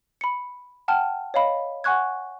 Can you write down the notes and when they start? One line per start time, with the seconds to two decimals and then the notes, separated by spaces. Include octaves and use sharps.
0.21 B5 C#7
0.88 F#5 G5 A5 F6
1.34 C#5 D#5 F5 B5
1.84 F#5 G#5 C#6 F#6 G#6